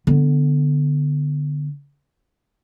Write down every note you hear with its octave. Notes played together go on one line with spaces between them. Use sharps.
D3 B3